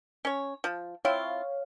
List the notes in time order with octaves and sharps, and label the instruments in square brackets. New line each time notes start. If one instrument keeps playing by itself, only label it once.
[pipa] C#4 C#5
F3
[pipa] C4 E4 F4 [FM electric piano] C#5 F5